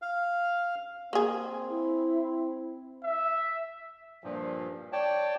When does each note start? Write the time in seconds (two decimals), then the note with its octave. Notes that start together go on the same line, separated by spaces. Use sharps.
0.02 F5
1.13 A#3 C4 G#4
1.69 E4
3.03 E5
4.24 G2 A#2 F3
4.93 C#5 D5 G5 A5